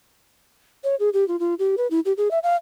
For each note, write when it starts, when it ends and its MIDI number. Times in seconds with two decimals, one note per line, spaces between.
0.84 0.95 73
0.99 1.09 68
1.13 1.27 67
1.28 1.39 65
1.39 1.54 65
1.59 1.75 67
1.77 1.87 71
1.91 2.00 64
2.05 2.13 67
2.17 2.31 68
2.31 2.39 76
2.43 2.56 77